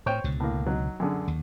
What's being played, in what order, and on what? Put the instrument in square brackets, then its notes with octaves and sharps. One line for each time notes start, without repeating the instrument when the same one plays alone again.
[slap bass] A2 [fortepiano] C5 C#5 G5
[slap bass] C#2 B2 D3
[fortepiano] A2 A#3
F#3 D#4
F#2 D3 G#4
[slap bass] D#2